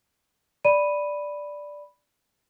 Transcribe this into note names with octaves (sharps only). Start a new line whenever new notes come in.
D5 B5 D#7